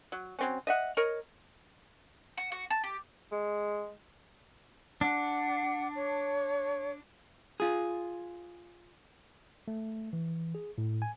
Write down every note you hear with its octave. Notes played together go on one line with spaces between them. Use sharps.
F#3
F#3 C4 C#4
D#5 E5 F#5
A#4 C#5 D#5
F#4
F#4
A5
G4
G#3
D4 F#5
C#5
F4 G#4
A3
E3
G#4
A2
G#5